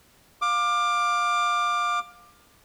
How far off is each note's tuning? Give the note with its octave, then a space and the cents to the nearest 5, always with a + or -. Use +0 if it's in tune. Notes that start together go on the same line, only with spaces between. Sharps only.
F5 +20 D6 +20